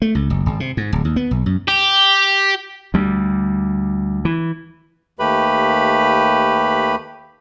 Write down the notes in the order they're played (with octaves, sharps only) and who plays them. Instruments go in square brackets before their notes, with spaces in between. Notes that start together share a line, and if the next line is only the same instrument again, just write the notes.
[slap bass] A3
C#2
F#1
G#1
C3
G#2
D1
D#2
B3
B1
F#2
[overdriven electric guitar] G4
[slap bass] D2 G3
E3
[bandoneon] D#2 A3 G4 B4 B5